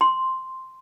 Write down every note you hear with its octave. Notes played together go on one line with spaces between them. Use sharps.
C6